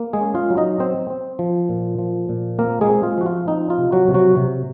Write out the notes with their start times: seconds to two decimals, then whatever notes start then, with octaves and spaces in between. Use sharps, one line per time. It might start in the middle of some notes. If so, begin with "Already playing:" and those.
Already playing: A#3
0.13 G#3 G#4
0.21 C#4
0.35 F4 F5
0.50 F#3
0.57 D#4 D#5
0.80 C4 C5
1.10 C4
1.39 F3
1.69 A#2
1.99 F3
2.29 A#2
2.59 A#3 C4 A#4
2.81 G#3 G#4
2.88 C4
3.03 F4
3.18 F3 F#4
3.26 F4
3.48 C4 D#4
3.70 F4
3.78 C3
3.92 F#3 F#4
4.08 C3
4.14 F#3 F#4
4.37 C3